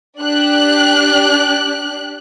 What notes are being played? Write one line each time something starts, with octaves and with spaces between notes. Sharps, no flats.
D4 G4 F#6